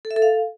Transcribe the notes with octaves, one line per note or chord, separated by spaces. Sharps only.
A4
E5
A4
F5